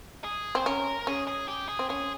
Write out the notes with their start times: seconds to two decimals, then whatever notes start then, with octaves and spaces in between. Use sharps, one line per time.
0.24 G#4
0.55 C4 C5
0.66 C#4 A#4
1.07 C#4 G#4
1.27 G#4
1.48 G4
1.69 G#4
1.79 C4
1.89 C#4 G#4